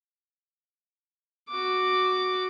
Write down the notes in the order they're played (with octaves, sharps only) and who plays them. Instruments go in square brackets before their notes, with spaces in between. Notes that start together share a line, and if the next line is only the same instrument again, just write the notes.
[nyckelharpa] F#4 D6